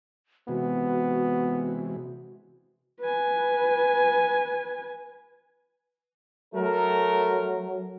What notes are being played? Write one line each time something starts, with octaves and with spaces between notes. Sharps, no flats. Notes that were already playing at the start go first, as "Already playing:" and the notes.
C3 E3 G#3 B3 F#4
B4 G#5
F#3 A3 A#4